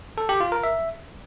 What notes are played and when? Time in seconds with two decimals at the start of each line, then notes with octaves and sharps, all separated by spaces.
0.18 A4
0.29 G4
0.41 F4
0.52 A#4
0.63 E5